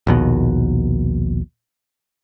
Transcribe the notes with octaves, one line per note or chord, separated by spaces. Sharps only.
A#1 D#2 B2